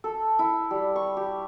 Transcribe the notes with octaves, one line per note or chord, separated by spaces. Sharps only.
A4
E4
G3
C#6
G4